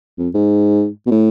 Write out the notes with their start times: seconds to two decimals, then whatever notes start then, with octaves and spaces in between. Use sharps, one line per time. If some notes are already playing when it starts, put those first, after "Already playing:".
0.18 F2
0.34 G#2
1.06 B2
1.11 A2